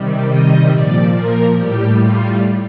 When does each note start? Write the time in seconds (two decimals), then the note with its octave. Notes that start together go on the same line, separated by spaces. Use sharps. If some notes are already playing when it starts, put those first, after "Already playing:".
Already playing: C3 D#3 G3
0.27 D#5
0.69 A#2 F3 D5
1.12 A#4
1.55 A2 G3 G4
1.98 F4